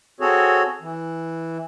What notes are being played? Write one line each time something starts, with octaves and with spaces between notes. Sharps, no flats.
C4 F#4 G#4 A4 C#5
E3